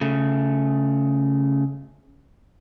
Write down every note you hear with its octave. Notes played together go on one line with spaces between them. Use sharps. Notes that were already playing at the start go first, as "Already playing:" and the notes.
C#3 A3